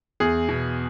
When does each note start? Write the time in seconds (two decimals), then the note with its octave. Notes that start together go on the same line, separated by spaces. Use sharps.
0.20 E2 G#4
0.49 B2